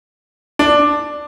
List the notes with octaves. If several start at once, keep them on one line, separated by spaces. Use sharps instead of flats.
D4